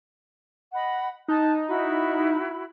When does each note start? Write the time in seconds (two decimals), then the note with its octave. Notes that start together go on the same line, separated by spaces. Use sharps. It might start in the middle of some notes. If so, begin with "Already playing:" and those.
0.73 D#5 F#5 B5
1.28 D#4 A5 F#6
1.68 E4 F#4 B5